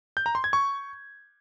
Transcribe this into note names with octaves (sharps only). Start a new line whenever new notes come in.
G6
A#5
C6
G#6
C#6